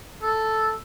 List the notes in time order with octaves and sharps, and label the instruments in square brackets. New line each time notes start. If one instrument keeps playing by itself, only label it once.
[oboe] A4